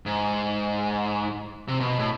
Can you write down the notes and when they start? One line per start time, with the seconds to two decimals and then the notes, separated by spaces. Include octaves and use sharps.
0.06 G#2
1.68 C3
1.80 B2
1.99 A2